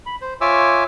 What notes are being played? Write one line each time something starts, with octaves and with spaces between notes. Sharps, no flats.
B5
C5
F4 C#5 E5 G#5 D6 E6